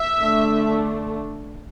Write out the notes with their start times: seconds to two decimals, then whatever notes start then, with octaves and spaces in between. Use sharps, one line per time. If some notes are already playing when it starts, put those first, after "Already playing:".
Already playing: E5
0.22 D3 A3 D4